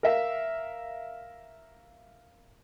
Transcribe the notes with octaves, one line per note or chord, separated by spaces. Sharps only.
A#4 E5 F5